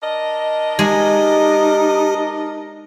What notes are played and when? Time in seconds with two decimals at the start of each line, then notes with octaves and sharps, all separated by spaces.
0.03 D4 A#4 D#5
0.79 G#3 D#4 G4